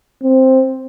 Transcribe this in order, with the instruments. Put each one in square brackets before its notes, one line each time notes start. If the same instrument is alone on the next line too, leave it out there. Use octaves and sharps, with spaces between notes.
[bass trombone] C4